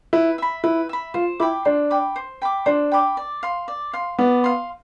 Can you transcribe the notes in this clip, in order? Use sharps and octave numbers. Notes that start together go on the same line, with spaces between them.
E4 B4
E5 B5
E4 B4
E5 B5
F4 C5
E4 G5 B5 D6
D4 C5
G5 B5 D6
C5
G5 B5 D6
D4 C5
G5 B5 D6
D5
F5 C6
D5
F5 C6
B3 D5
F5 C6